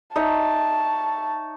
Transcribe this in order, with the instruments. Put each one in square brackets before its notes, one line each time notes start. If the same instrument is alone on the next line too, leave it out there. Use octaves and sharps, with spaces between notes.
[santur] D#4 C#5 E5 [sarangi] A5